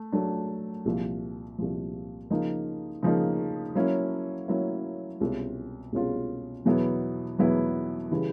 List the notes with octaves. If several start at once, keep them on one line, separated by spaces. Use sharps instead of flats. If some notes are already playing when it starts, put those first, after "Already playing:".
Already playing: A3
F#3 A3 D4
C2 A#2 F3
C2 A#2 F3
C#3 F3 A#3 D#4
C#3 F3 A#3 D#4
F#3 A#3 C#4 E4
F#3 A#3 C#4 E4
C2 B2 G#3 C#4 F4
C2 B2 G#3 C#4 F4
E2 B2 F#3 B3 E4
E2 B2 F#3 B3 E4
C#3 E3 G3